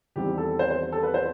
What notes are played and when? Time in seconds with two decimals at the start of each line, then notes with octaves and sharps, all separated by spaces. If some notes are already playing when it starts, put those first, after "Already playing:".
0.16 E2 D#3 G3 C4 G4
0.38 A4
0.59 C5
0.70 C5
0.92 A4
1.03 B4
1.14 C5